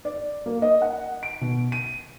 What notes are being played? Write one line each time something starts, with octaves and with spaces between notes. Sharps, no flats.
D5
A#3
D#5
F#5
D7
B2
D#7